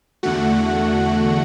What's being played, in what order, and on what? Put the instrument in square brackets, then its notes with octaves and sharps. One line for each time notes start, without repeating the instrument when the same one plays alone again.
[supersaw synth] E2 D3 A3 F#4 F#5